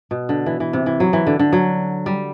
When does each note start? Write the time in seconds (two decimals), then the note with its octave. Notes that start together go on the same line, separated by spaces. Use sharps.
0.11 B2
0.29 D3
0.46 E3
0.60 E3
0.73 C3
0.86 E3
1.00 F#3
1.13 E3
1.27 D3
1.39 D3
1.53 F#3
2.06 G3